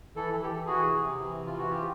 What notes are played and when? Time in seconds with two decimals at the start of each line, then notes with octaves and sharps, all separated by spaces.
0.16 E3 A4
0.33 E3
0.43 G4 A4
0.50 E3
0.66 E3 F#4 G#4
0.84 C3
1.01 C3
1.18 E3
1.35 C3
1.46 F4
1.52 E3
1.58 F#4
1.69 C3 F4 G4